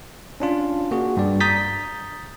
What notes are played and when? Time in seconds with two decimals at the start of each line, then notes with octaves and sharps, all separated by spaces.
0.40 C#4 D4 F4
0.91 A#3 F#4 G#4
1.17 G2 D5
1.41 A#5 D#6 G6 A6 B6